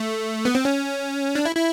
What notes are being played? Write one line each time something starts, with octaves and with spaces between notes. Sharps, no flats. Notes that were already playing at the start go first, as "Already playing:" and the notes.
Already playing: A3
B3
C4
C#4
D4
E4
E4